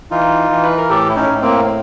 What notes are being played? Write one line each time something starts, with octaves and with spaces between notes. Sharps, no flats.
E3 D#4 F4
E3
B4
A#4
A2 G4 A4
E4
C#4 D#4
A2
A#3 C4